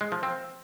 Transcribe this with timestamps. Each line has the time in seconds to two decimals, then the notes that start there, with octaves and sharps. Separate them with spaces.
0.01 G#3
0.12 F3
0.23 C4